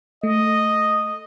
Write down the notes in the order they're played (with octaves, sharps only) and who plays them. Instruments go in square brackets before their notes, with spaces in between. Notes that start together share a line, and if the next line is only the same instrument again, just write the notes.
[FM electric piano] A3 [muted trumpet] D#5